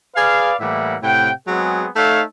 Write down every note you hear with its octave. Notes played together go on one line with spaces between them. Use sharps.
G#4 B4 D5 F5
A2 E3 G3 A#3 E5 F#5
A2 C3 F#5 G5
F#3 G#3 B3 C4 G#4
A3 D#4 A4 C#5 E5 F5